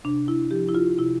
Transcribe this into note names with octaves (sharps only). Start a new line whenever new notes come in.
C3 D4
E4
F3 G4
E4
F4
C3 E4